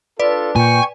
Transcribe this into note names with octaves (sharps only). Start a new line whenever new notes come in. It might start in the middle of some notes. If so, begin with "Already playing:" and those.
D4 F4 A4 B4 D5
A#2 G5 G#5 C#6